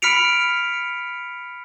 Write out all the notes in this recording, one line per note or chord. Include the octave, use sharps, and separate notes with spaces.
B5 F6 B6 C#7 D7 F7